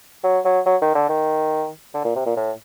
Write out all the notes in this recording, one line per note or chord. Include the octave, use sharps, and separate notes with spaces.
F#3
F#3
F#3
D#3
D3
D#3
D3
A#2
C3
A#2
A2